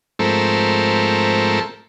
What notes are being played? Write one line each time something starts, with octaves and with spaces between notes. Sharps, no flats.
G#2 F3 A3 C4 A4 A#4